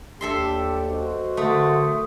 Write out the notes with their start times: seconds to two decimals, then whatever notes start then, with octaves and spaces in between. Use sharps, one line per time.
0.21 D#2 D4 G4 A4 E5 C6
0.89 B1 F#4 C5 D#5
1.37 D3 A3 A#4 D#6